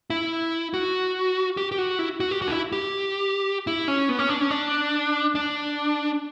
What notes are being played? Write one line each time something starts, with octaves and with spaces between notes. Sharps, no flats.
E4
F#4
G4
G4
F#4
E4
F#4
G4
F#4
D4
E4
G4
E4
C#4
B3
C#4
D4
C#4
D4
D4